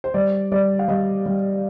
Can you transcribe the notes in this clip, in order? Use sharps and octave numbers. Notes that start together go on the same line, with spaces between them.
C5
G3 D5
G3 D5
F5
G3 D#5
G3